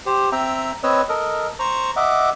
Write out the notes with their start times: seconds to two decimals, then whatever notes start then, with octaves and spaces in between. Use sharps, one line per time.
0.06 G4 C5
0.32 C4 E5 G5 A#5
0.83 C4 B4 C#5 D#5 E6
1.09 A4 A#4 D#5
1.59 C5 A#5 C#6
1.96 D#5 E5 F#5 D6